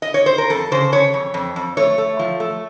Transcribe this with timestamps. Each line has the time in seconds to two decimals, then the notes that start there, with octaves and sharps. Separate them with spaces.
0.02 D#5
0.14 C#5
0.26 C5
0.38 A#4
0.50 F2 A4
0.72 C#3 C5
0.92 C#3 C#5
1.14 F2
1.34 F2
1.56 F2
1.77 A3 C#5
1.98 A3
2.19 F3
2.40 A3